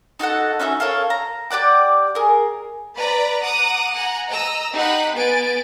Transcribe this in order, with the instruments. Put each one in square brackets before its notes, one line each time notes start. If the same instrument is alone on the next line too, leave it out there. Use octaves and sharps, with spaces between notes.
[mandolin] D#4 F#4 A4 F#5
C#4 D#4 F#4 E5
F4 A4 A#4 C#5
A#5
G4 D5 F#5 D6
G#4 A#4
[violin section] B4 D5 A#5 B5
F#5 A#5 D6 D#6
F#5 G#5 A#5
D#5 A#5 E6
D#4 G4 F#5 B5
B3 G#5 A6 D7